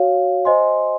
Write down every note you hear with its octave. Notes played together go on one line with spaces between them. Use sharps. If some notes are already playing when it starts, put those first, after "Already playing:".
Already playing: F#4 C#5 F5
C5 D#5 G#5 C6